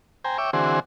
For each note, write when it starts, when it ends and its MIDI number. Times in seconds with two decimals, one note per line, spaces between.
0.24 0.38 72
0.24 0.38 79
0.24 0.38 80
0.24 0.38 82
0.38 0.51 73
0.38 0.51 76
0.38 0.51 79
0.38 0.51 86
0.53 0.80 50
0.53 0.80 52
0.53 0.80 60
0.53 0.80 66
0.53 0.80 68
0.53 0.80 72